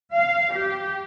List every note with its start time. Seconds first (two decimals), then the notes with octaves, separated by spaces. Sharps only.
0.13 F5
0.53 G4